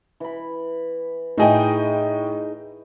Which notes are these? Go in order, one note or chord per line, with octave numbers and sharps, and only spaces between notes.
E3 B5
A2 D#4 G#4 D#5 G5